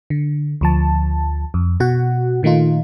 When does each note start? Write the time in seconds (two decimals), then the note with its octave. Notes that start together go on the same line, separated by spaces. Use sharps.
0.10 D3
0.61 D2 F3 A5
1.54 F2
1.80 B2 F#4 F#5
2.43 A#2 D#3 A3 D#4 F4